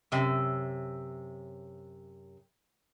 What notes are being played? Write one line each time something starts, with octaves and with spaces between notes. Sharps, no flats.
F#2 C3